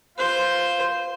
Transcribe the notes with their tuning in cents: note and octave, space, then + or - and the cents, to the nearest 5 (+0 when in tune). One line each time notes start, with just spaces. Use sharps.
F4 +0 C5 +0